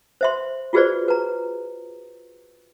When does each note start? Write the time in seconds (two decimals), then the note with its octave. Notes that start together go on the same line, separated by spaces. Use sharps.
0.21 C5 E5 C6
0.73 F4 F#4 G#4 B4 C5 D5
1.08 B4 A#5